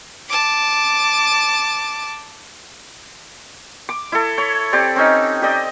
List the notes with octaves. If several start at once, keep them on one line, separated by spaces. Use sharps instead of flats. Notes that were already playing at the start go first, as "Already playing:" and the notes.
A5 D6
D6
E4 A4
C#5
C4 G4 D5
C4 C#4 D#4
G4 D5 D#5